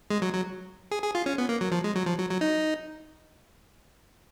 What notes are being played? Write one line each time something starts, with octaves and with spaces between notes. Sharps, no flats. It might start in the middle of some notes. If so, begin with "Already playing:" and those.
G#3
F#3
F#3
G#4
G#4
F4
C#4
B3
A#3
F#3
F3
G#3
F#3
F3
F#3
F#3
D#4